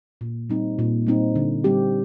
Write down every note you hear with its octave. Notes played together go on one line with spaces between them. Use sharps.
A#2
G3 C4 D#4
A#2
G3 C4 D#4
D3
G3 C4 G4